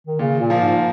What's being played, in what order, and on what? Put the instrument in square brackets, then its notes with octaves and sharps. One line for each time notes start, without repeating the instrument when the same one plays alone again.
[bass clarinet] D#3
[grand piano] A#2 [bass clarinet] C#3
[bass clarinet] A#2
[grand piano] F3 A#3
[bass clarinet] G#2